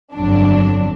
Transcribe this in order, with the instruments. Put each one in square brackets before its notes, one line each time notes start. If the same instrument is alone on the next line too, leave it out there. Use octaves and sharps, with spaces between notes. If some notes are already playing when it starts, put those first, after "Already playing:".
[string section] G1 F2 D3 F#3 D4